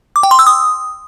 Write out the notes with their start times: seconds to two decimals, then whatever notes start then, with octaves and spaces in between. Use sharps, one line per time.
0.16 D6
0.23 G5
0.31 C6
0.39 E6
0.47 D#6